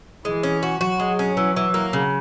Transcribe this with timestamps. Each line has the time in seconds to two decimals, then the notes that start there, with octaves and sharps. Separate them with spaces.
0.25 E3 G#3
0.43 C#4
0.63 F#4
0.81 F#3 F#4
1.00 G#3
1.19 C#4
1.37 E3
1.56 E3
1.74 A#3
1.93 C#3